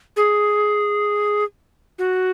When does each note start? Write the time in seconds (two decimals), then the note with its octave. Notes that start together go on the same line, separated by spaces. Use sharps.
0.17 G#4
1.99 F#4